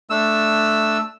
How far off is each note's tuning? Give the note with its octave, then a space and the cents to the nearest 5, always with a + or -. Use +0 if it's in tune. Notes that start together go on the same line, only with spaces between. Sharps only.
A3 +0 D4 +0 E6 +0